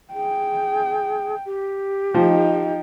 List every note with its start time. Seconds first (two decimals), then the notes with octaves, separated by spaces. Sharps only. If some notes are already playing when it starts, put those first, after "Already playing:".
0.14 G#4 G5
1.45 G4
2.14 F3 D#4 G5